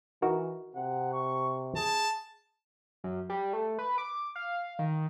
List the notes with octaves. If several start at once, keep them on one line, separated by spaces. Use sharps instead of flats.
E3 D#4 F#4 A#4
C3 F#5
C#6
G#4 A5
F#2
G3
A3
B4
D6
F5
D#3